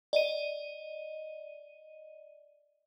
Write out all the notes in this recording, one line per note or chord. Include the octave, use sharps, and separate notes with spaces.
D5 D#5 D#7